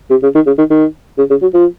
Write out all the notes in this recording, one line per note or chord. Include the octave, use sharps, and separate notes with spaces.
C3
C#3
D#3
C#3
D#3
D#3
C#3
C#3
F#3
F3